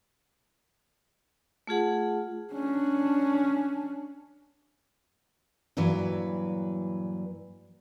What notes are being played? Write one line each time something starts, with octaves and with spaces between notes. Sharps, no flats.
A3 F4 G#4 F#5
C#4 D4
G2 A#2 E3 F#3 B4